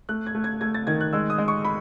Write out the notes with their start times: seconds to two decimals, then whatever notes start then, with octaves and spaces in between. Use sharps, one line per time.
0.09 A3 F#6
0.26 G#6
0.35 A3
0.44 G#6
0.61 A3 G#6
0.74 A6
0.87 D#3 G#6
1.01 F#6
1.13 G#3 E6
1.30 D#6
1.38 G#3
1.48 C#6
1.65 B5